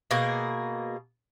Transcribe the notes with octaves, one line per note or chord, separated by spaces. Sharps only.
B2 A#3 G#4